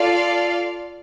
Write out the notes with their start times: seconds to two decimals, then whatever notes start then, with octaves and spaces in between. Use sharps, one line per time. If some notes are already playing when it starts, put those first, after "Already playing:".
Already playing: F4 A4 D5 F5